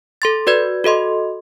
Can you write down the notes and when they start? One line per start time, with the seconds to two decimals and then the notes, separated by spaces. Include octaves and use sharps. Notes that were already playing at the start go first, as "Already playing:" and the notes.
0.22 A4 C6 A6
0.47 F#4 B4 D5 G#6
0.84 F#4 A4 D#5 C6